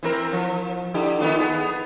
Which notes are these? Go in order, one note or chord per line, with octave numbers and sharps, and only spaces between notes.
E3 C4 A#4
F3
D3 E4 G4
D#3 B3 F4
B3 G#4